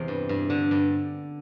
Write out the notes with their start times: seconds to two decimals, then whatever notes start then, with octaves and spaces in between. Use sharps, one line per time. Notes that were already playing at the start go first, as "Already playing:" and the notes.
Already playing: E2 C3 E3
0.08 G2
0.29 G2
0.50 D3
0.71 G2